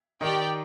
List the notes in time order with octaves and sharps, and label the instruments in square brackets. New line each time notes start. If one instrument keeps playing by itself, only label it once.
[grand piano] D#3 D#4 [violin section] G4 D5 G5